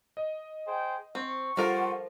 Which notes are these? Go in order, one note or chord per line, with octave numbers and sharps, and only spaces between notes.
D#5
G#4 C5 G5
C4 C#6
F3 G3 F4 A4 A#4 F#5